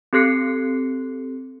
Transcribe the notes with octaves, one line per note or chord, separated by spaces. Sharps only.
C4 G4 A4 F#6 C7 C#7